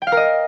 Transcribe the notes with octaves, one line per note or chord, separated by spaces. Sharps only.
G5
F5
A#4
D#5